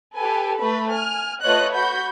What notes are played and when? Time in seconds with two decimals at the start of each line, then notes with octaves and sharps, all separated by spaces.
0.15 G4 A4 B4 G#5
0.58 A3 B4 B5
0.90 G#5 F6
1.42 A3 F4 B4 C#5 D#5 F#6
1.73 F#4 B5 G6